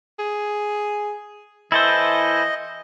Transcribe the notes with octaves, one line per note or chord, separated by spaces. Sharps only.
G#4
E3 E4 A4 C5 D#5